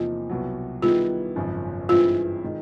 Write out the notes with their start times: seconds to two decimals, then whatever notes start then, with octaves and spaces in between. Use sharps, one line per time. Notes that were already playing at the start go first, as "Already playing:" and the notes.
Already playing: E2 C3 F3 A#3 D#4 F4
0.29 C2 B2 F#3
0.82 D#3 G3 B3 E4 F4 G#4
1.36 G#1 F#2 C#3 F3
1.89 G2 E3 G#3 C4 E4 F4
2.44 D#3 G#3